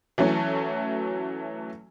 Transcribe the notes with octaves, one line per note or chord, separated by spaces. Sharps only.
E3 F#3 A3 C#4